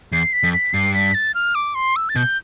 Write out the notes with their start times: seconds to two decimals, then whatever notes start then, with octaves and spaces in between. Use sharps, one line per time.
0.12 E2 C7
0.33 B6
0.43 F2
0.53 B6
0.73 G2 C7
0.94 B6
1.14 A6
1.35 F6
1.55 D6
1.75 C6
1.96 E6
2.09 A6
2.16 B2 G6